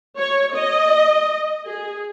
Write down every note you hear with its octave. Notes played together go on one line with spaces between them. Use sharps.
C#5
D#5
G#4